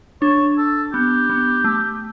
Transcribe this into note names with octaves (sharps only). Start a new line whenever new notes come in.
D4 C#5
A4
B3 G4
B3
A3